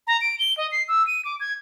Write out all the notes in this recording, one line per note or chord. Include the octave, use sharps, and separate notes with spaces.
A#5
D7
G7
D#5
C7
E6
D#7
D6
G#6